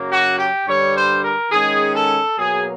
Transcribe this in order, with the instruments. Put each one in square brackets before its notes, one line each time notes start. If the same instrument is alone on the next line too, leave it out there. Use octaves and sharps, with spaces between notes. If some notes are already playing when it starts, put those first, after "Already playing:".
Already playing: [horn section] F#2 C#3 F#3 A#3
F#4
G4
G2 D3 G3 C#5
C5
A#4
D#3 G#3 C#4 G#4
A4
B2 F#3 A#3 G#4